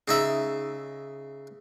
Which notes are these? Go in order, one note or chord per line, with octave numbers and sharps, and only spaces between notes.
C#3 D#4 E5